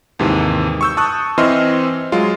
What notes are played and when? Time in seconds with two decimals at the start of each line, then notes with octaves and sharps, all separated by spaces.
0.19 D#2 G#2 C3 E3
0.81 C#6 E6 G6
0.97 A5 C#6 D#6 F#6
1.38 E3 C4 D#5 E5 C6 F6
2.12 F#3 G#3 F4